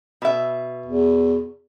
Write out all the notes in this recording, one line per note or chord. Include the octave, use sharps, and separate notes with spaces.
B2 E5
E2